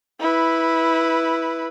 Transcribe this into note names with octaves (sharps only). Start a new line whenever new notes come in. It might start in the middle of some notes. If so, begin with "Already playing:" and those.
E4 B4